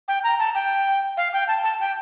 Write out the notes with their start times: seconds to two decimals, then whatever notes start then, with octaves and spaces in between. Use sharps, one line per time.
0.08 G5
0.24 A#5
0.39 A5
0.55 G5
1.17 F5
1.33 G5
1.48 A5
1.64 A5
1.80 G5